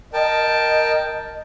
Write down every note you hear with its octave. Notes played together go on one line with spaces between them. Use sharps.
A#4 D#5 G5 A5